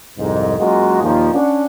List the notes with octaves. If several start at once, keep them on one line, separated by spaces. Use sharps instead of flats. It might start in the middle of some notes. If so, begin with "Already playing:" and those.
C2 F2 G#2
F#2 G#3 A#3 F4 F#4 D#5
D#2 A#2 D#3 F3
C#4 D4 F#5